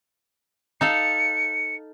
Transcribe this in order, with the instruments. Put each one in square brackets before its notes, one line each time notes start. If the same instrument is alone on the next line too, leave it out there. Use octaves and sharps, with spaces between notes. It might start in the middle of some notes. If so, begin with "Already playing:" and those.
[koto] D#4 A4 F5 [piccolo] C#7